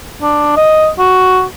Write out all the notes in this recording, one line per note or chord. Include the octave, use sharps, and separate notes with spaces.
D4
D#5
F#4